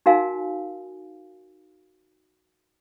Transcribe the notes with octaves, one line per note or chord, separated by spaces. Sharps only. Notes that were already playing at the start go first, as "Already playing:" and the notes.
D#4 F#4 A#4 F5 G#5